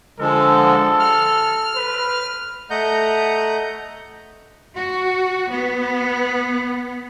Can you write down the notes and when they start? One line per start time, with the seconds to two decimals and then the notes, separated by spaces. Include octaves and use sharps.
0.19 D3 F3 G#3 A4
1.00 F6
1.75 B4
2.71 A3 D#5 F#5 A#5 G6
4.76 F#4
5.52 B3